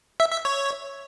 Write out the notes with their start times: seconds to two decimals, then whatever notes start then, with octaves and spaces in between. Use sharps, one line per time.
0.20 E5
0.32 E5
0.45 C#5